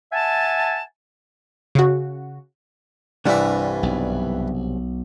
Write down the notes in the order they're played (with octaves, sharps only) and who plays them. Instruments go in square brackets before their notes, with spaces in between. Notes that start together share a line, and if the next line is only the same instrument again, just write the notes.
[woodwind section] E5 F#5 G#5 A5
[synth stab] C#3 F#4
[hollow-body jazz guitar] C2 G3 D4 [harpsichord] G2 E3 E5
[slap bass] B1